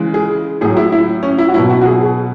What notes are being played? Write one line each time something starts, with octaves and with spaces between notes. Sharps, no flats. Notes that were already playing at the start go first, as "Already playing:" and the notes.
Already playing: C#3 E3 G#3
G#4
A2 F#3 G#4
E4
E4
C#4
E4
F#4
B2 F#3 E4
F#4
F#4
G#4
G#4